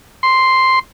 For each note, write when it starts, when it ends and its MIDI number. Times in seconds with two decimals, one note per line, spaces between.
0.23 0.79 84